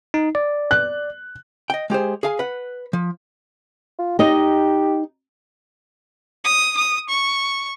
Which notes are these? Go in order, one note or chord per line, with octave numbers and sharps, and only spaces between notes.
D#4
D5
F#6
D#5 G5
G#3 G4 G#4 C5
G#4 F5 G#5
B4 F#5
F3
F4
D#4 G4 D#5
D#6
D#6
C#6